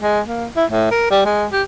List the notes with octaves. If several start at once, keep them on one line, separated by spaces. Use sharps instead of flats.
G#3
A#3
E4
A2
A#4
G3
G#3
G4